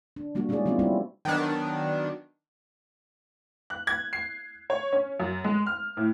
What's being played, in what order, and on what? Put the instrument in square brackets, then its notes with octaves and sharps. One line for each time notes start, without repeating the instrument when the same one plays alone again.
[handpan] D4
G3 A#3 D4 F#4
G#3 C#4 D#4 E4 G#4 D5
F#3 B3 C4 D4 F4
F#3 G3 C#4 E4 F4
[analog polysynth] D#3 F#3 B3 D4
[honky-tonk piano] F#6
G#6
C7
C#5
C#4
F#2
G#3
F6
A2